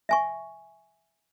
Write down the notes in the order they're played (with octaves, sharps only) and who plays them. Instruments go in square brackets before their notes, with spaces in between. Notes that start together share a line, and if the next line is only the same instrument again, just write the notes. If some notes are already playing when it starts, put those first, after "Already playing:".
[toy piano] E5 G#5 C#6